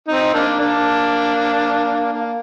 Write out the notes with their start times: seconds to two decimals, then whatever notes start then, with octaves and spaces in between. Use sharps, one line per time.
0.08 C4 D#4
0.34 A#3 D4
0.60 A#3 D4
2.13 A#3